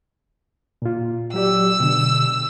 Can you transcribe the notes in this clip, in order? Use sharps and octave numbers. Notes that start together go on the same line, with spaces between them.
A#2 F4
F#3 G4 D5 E6
B2 D3